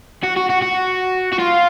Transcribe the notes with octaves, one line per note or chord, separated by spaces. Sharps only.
F#4
F#4
F#4
F#4
F#4
F4